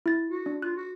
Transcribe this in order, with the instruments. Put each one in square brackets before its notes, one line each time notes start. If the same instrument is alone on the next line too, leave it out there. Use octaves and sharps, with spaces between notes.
[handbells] E4 A6
[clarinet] F#4
[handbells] D4
[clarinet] F4 [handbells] F#6
[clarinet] F#4